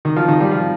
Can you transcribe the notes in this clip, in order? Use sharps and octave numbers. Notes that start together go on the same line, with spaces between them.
D#3
F3
D#3
G3
F3